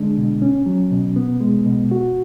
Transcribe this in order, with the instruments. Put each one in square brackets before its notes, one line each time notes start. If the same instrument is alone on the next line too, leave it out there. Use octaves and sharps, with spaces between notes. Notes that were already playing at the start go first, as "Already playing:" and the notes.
Already playing: [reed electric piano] D3 G#3 D4
B2
C#4
F#3
B2
B3
G#3
B2
F#4